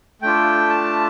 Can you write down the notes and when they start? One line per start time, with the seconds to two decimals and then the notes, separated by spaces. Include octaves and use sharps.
0.22 A3 D4 F4 G5
0.69 A5